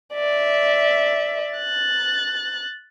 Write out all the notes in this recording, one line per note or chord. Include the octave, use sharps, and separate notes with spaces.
D5 E5
F#6 A6